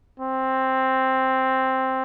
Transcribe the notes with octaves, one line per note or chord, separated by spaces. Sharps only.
C4